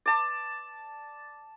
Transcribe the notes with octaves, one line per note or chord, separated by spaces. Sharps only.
D5 A5